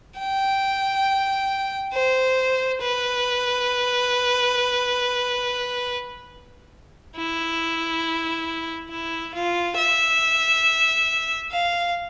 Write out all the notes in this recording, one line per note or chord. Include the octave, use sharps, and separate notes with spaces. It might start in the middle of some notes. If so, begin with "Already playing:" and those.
G5
C5
B4
E4
E4
F4
E5
F5